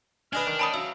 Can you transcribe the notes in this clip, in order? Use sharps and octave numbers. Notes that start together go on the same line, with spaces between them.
D4 B4 D#5 G#5 F6
D#3
C#4 D#5 G5 A5 B5 D#6
F#3 E5 F5 E6